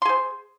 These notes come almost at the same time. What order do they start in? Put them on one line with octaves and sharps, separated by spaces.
C6 G#4 C5